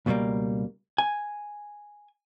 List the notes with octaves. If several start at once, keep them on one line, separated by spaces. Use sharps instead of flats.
C#2 B2 F#3 G3 A#3
G#5